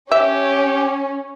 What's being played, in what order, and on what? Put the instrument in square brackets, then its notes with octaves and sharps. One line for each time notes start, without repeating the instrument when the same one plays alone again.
[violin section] C#4 [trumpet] G4 [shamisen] E5